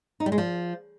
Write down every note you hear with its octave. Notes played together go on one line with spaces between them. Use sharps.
D#4
G3
G#3
F3